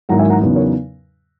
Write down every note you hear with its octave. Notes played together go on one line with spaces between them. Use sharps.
G#1 G#2 F#3 A#3 E4 F#5 A#5
E5 G#5
F#5 A#5
E2 C#3 F#3 B3 D#4
A#4 C#5